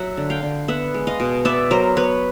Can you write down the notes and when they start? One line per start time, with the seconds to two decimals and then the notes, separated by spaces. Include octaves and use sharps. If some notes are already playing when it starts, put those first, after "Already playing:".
Already playing: F#3 E5 F#5
0.17 D3
0.30 F5 G5
0.43 D3
0.68 B3 E5 F#5
0.94 G#3
1.07 D#5 F5
1.20 B2
1.45 B3 D5 E5
1.71 F#3 A#4 C5
1.96 B3 B4 C#5